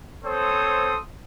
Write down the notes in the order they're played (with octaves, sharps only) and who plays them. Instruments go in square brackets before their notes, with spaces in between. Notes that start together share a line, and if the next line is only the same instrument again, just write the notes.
[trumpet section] C4 A4 C5 C#5 D#6